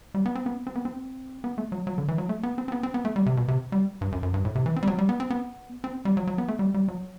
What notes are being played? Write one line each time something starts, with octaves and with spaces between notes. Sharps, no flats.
G3
B3
C4
B3
C4
B3
C4
B3
A3
F#3
F#3
D3
E3
F#3
A3
B3
C4
C4
B3
C4
B3
A3
G3
C3
B2
C3
G3
G2
F#2
F#2
G2
A2
C3
E3
C4
G3
F#3
G3
B3
C4
B3
C4
G3
F#3
F#3
B3
A3
G3
G3
F#3